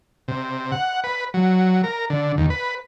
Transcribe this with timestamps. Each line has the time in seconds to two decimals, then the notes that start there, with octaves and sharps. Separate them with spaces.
0.28 C3
0.72 F#5
1.04 B4
1.34 F#3
1.83 A#4
2.10 D3
2.37 D#2
2.50 B4